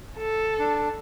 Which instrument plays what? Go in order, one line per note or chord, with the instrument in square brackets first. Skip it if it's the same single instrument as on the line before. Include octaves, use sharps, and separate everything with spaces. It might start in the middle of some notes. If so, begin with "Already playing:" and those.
[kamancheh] A4
[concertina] D4